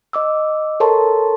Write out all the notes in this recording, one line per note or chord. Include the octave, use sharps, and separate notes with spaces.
D#5 D6 E6
A4 A#4 C#5 A5 C6 C#6